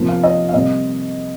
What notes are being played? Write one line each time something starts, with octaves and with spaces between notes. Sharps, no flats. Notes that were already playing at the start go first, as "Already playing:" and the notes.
Already playing: C3 F3 A#3
F5
D#5
F5
C3 G3 A#3 D#5